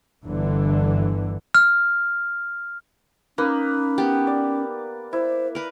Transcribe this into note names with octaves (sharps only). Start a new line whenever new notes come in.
G1 D3 E3
F6
A#3 C#4 D#4 B4
B3 G4
D5
E4 C5
A#4 B4